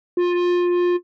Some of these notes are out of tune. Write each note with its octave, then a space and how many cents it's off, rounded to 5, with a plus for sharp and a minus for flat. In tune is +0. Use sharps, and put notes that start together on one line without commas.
F4 +20